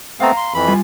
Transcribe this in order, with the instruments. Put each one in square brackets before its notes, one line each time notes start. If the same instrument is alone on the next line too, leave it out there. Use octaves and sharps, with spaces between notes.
[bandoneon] A3 B3 C4 [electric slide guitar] F5 A#5
[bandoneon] C6
F2 E3 B5
[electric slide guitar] G3 F4 G#5